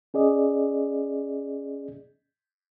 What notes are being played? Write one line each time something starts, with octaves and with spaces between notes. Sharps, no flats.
C#4 G#4 D5 D#5